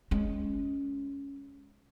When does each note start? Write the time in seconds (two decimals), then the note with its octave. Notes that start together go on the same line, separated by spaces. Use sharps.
0.11 G#3 C#4